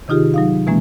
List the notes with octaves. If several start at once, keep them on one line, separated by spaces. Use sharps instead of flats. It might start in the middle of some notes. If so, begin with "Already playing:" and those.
C3 D#3 D#4 F4 G4 G#4
F#3 D#4 F5
B2 E3 G#3 A#3 C#4